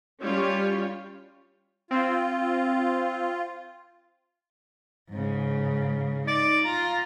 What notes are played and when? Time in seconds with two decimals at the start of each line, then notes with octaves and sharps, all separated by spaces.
0.22 G3 C#4 F4 C#5
1.91 C4 F4
5.10 G#2 C#3
6.27 D#4 D5
6.65 F4 A#5